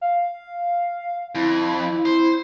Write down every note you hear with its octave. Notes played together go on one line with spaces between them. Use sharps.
F5
F2 E4
C5